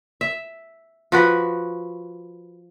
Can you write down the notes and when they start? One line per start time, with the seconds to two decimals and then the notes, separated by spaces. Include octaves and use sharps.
0.21 E5
1.12 F3 F#4 B4